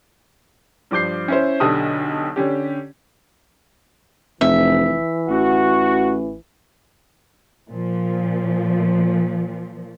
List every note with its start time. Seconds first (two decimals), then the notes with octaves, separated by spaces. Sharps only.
0.91 G2 F3 D6 G6 C7
1.28 C#4 E4 C5
1.60 B1 D3 G4 A5 D#6
2.36 D3 C#4 G4
4.41 F1 E3 E5
5.29 A1 F#4
7.69 A#2 F3